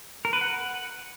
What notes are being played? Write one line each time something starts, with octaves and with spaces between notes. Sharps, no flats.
A#4
B4
F#5